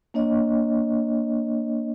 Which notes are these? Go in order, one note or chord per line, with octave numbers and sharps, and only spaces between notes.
A#3 D4 C#5 D#5